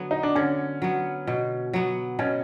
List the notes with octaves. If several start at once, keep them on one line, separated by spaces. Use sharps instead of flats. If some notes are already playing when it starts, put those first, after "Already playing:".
Already playing: D3 F#3 B3
D#4
D4
D3 C#4
F#3 B3
B2
F#3 B3
B2 C#4